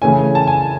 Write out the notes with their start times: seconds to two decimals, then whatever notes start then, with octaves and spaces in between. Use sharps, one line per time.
0.02 C#3 E3 A3 C#4 G#5
0.35 A5
0.47 G#5